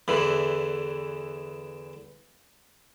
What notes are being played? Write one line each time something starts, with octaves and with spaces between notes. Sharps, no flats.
E2 D3 E3